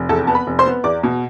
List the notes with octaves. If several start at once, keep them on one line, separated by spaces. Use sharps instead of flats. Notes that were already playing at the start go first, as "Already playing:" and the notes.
Already playing: F1
E2 A4 A5
B3 A5
B4 B5
F1
C5 C6
B3
E2 D5 D6
B2